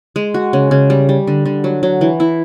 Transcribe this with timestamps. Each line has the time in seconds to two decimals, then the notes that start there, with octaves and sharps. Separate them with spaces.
0.16 G#3
0.34 F#4
0.53 C#3
0.71 C#3
0.90 G3
1.09 G3
1.27 D3
1.46 D3
1.64 F#3
1.83 F#3
2.01 E3
2.20 E4